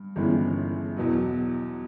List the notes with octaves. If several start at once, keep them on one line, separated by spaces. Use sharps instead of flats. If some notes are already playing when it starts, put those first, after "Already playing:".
Already playing: G2
G1 G2 E3 G#3 C#4
E2 B2 F#3